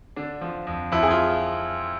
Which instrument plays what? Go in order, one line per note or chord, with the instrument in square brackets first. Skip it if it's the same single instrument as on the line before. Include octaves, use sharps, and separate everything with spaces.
[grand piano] D3 D4
F3
F2
F2 E4
G#4
F4